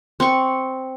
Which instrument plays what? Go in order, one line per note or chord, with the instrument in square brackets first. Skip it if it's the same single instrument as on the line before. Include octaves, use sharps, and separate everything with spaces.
[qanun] C4 C#6